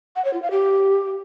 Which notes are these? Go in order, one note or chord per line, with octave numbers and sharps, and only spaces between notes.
F#5
C#5
F4
F5
G4